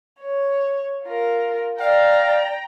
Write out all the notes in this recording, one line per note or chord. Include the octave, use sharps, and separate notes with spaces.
C#5
F4 A#4
D5 F5 G5 A#5